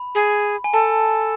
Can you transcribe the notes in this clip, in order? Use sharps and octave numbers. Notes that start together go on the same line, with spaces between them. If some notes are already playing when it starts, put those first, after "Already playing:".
Already playing: B5
G#4
G#5
A4 A5